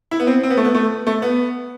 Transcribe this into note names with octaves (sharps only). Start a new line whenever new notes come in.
E4
B3
C4
C4
B3
A3
B3
A3
A3
B3